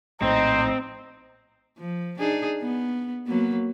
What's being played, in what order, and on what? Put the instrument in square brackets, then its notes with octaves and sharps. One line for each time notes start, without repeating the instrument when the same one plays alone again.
[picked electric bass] A#1 A2 [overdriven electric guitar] C4 [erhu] D#4 [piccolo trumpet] C5
[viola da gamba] F3
D4 D#4 G#4
B3
F#3 A#3 B3